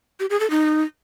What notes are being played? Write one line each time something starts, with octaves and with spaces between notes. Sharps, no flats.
G4
G#4
A4
D#4